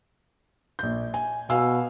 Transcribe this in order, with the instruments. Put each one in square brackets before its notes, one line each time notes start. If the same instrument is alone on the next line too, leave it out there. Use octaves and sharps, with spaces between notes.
[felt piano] A#1 G6
G#5
[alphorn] B2 [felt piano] F5 G#5 E6